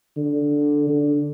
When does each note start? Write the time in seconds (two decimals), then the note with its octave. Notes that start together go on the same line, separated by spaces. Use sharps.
0.17 D3
0.89 D3